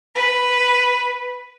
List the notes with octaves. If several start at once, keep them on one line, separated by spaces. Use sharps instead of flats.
B4